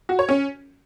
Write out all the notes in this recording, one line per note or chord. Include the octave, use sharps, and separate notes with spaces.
F#4
C#5
C#4